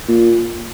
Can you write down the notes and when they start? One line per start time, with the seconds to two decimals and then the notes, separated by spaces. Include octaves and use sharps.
0.08 A#2